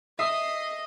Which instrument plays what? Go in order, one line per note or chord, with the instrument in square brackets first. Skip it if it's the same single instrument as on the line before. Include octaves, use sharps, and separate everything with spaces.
[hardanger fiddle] D#5 [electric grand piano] E5 [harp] D#6 [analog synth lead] C7